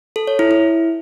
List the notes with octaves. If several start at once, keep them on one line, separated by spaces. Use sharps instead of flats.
A4
C#5
E4
E4